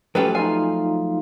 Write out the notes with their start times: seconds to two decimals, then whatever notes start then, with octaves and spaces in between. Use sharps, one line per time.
0.15 F3 F#3 A3 C#4 G4 B4
0.35 D#4 F4 F5 G#5